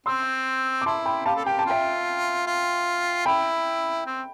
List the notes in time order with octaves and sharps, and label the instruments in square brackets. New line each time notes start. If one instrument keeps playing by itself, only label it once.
[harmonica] C4 [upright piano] C6 E6
[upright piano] D6
[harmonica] E4 [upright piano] A5 C6
[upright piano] G5 B5
[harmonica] G4 [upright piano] F5 A5
[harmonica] A4
[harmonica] G4 [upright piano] G5
[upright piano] A5
[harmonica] F4 [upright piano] E5 G5
[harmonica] F4
[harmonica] E4 [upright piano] G5 B5
[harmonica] C4